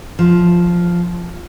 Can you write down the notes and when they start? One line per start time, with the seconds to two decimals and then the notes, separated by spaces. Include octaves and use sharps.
0.19 F3